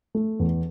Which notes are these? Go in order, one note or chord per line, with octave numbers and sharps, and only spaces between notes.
A3
E2